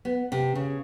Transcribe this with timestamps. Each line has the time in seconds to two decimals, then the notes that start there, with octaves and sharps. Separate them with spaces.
0.05 B3
0.32 C3
0.55 C#3